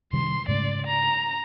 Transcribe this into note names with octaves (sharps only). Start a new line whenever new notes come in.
C3 D#3 G3 C6
G#2 C#3 A3 D5
A#5